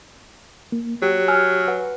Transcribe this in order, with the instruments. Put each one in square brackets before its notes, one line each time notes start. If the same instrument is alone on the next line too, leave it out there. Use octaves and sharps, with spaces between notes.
[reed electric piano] A#3
[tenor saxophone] F#3 [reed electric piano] G4
[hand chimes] G#5 E6 F6
B4 F#5